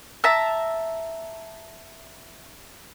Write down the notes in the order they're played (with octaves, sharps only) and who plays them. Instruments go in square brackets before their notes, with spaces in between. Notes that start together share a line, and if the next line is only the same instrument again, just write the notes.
[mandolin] E5 A5 A#5 E6